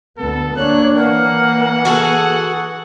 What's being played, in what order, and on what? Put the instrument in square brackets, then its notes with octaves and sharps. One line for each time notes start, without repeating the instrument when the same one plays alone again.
[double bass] D2 B3 [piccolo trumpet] A4
[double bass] A#3 D4 [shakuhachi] C#5 [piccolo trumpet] F#6
[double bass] E3 [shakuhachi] A#3 [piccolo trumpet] F#5
[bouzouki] F#4 G#4 A4